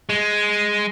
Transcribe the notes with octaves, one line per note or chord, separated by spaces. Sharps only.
G#3